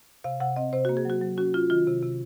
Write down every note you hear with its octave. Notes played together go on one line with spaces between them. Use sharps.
C3 F5
C3 F#5
C4 D#5
C3 C5
F#4
A#3
G#4
F#3 F#4
F#3
C#4 F#4
C#4 F4
D#3 F4
C3
C3